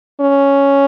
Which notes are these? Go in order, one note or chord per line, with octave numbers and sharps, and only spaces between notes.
C#4